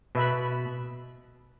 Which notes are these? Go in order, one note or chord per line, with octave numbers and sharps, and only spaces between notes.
B2 B4 E5 B5